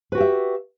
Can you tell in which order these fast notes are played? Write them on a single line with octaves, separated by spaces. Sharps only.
B4 F#4 G4 E5